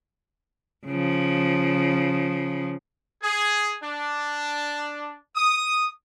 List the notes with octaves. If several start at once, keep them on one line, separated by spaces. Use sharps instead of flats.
C#3 F3
G#4
D4
D#6